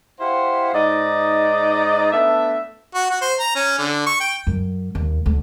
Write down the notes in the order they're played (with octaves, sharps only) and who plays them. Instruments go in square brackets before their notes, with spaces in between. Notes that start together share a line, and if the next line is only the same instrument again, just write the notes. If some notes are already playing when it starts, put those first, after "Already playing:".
[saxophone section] E4 G4 C5 F5 F#5
G#2 D#4 D5 D#5
A3 B3 D4 E5
[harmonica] F#4
F#4
C5
A#5
C#4
D3
C#6
G5
[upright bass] F#2
D#2
D2